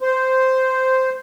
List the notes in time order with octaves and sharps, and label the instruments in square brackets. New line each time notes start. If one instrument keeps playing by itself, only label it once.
[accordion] C5